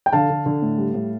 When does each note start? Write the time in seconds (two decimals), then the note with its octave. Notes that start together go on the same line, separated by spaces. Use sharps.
0.06 G5
0.13 D3 F5 A5
0.30 D3
0.46 D3
0.62 A2
0.78 G3
0.94 A2